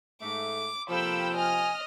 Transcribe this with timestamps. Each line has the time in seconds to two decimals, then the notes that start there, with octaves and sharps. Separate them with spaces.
0.22 G#2 A3 D6
0.89 C3 F3 A#3 A4 G5 B5 E6
1.36 D#5 G#5 F6